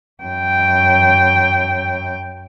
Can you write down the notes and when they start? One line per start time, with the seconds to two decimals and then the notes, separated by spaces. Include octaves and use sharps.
0.23 F#2 G5